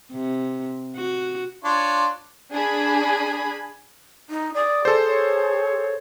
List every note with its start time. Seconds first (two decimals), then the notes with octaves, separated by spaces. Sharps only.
0.13 C3
0.96 F#4
1.64 D4 F4 C#5
2.51 D4 G#4 G#5 B5
4.30 D#4
4.55 D5 D#6
4.85 G#4 A4 C5
5.08 C#5